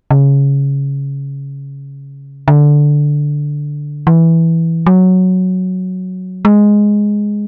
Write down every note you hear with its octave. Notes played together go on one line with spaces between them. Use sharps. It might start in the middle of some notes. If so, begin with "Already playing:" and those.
C#3
D3
E3
F#3
G#3